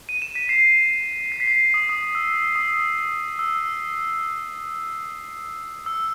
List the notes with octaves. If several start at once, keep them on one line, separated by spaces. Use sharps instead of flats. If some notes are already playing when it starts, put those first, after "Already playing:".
D#7
E7
B6 D#7
C7 E7
C7
B6
C7
D#6
D#6
E6
D#6
E6
E6